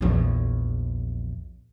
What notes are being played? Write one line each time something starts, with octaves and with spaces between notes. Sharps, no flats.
A#1 E2